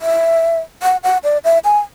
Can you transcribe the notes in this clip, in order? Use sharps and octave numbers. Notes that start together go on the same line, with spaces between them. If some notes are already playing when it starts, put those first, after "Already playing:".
E5
F#5
F#5
D5
E5
G#5